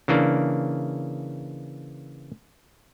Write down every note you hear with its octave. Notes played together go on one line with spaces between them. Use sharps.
C#3 E3 A#3 D4